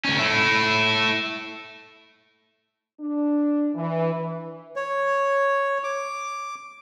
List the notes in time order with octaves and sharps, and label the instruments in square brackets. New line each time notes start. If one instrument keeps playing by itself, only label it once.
[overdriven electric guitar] D2 C#4
A3 E4
[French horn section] D4
E3
[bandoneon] C#5
D6